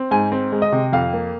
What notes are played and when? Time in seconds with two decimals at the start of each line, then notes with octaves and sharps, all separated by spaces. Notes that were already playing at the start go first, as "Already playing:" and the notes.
Already playing: C4
0.11 G#2 G#5
0.32 C4
0.52 G#3
0.62 D#5
0.72 C3
0.93 F2 F5
1.13 A#3